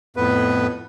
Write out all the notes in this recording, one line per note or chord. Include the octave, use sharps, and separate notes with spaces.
F2 A2 B3 B4